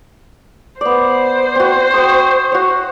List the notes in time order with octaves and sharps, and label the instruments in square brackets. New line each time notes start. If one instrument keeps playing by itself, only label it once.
[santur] B3 D5 [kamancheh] C5
[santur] C4 F#4
G5 C#6 D#6
F#4 C#5